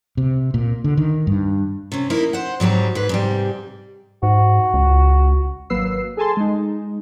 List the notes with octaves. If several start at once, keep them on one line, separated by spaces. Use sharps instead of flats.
C3
A#2
D3
D#3
G2
C3 C#4
A#3 D#4 E4 A#4
C5 F#5
G#2 F#3 G3 C4
G#2 B4
G#2 C3 G3
G#2 F#4
C#2
G#1 F#3 A#3 B4 E6 C7
G#4 A4 G#5 A5 C6
G#3 D#4